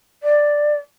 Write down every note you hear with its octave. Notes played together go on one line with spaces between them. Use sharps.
D5